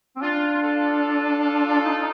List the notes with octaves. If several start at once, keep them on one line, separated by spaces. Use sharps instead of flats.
C4
D4 F4
F4 A4
D#4